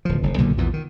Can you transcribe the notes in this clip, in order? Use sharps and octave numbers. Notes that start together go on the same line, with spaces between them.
D1 F3
F1
B1 A#2 D3 D#3
A#1 E2 A#2 E3
D#3